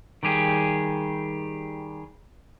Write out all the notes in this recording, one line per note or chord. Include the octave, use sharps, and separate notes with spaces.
D#3 G3 G4 G#4